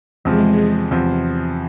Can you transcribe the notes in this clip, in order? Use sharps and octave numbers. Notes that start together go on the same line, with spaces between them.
E2 C3 F3 G#3
E2 C3 F3